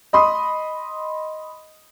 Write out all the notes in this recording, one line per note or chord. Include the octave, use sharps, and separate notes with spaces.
D#5 B5 C6 D#6